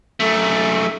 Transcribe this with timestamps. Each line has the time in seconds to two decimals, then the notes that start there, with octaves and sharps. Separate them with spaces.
0.20 F#2 A3